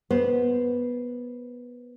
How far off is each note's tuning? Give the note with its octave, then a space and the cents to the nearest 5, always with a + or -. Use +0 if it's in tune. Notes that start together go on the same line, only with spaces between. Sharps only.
B3 -15 C5 +0